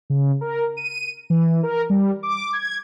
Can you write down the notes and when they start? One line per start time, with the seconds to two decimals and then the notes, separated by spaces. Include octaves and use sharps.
0.10 C#3
0.41 A#4
0.77 D#7
1.30 E3
1.63 A#4
1.90 G3
2.23 D6
2.53 G#6